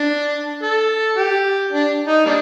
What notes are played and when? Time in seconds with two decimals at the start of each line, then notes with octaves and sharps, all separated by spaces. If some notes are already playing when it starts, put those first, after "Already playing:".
Already playing: D4
0.63 A4
1.17 G4
1.72 D4
2.08 D#4
2.26 G3 A#3 D4